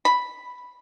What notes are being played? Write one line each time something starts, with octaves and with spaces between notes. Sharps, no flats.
B5